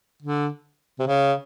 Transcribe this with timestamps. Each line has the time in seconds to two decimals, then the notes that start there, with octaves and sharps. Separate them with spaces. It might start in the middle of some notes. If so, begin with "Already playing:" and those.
0.23 D3
1.00 C3
1.08 C#3